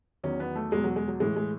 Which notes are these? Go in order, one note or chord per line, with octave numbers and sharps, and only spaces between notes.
E2 D#3 F#3 C#4
B3
A3
E2 B2 F#3 G#3
F#3
G#3
F#3
A2 E3 G#3
G#3